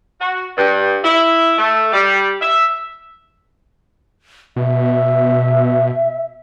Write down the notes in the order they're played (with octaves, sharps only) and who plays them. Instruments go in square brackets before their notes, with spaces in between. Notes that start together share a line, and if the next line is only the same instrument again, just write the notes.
[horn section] F#4
G2
E4
A3
G3
E5
[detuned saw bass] B2 [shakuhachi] E5